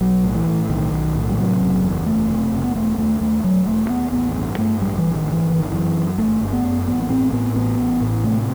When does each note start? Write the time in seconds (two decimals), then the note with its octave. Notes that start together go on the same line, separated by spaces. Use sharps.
0.01 B1 F#3
0.23 A2
0.35 E3
0.47 A2
0.69 B1 D#3
0.92 B1
1.15 A2
1.30 G3
1.38 C3 F#3
1.61 F#1
1.84 E2
2.06 F#1 A3
2.30 C3
2.52 F#1
2.64 B3
2.75 E1 A3
2.98 D#2 A3
3.21 D#2 A3
3.44 E1 F#3
3.67 E1 A3
3.90 D#2 B3
4.13 A1 B3
4.36 G2
4.58 G2 A3
4.81 A1 G3
4.98 E3
5.04 A1
5.15 D#3
5.27 G2
5.32 E3
5.50 G1 E3
5.60 D#3
5.70 F#2 E3
5.95 F#2
6.18 G1 A3
6.41 G1
6.53 B3
6.64 F#2
6.87 A1 B3
7.02 B3
7.10 A2 C4
7.33 A2 B3
7.55 A1 B3
7.79 A1
8.01 A2
8.24 C3 A3